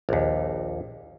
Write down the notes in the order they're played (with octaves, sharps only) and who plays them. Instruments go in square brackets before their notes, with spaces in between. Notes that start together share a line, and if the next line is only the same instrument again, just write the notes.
[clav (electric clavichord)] A#1 D#2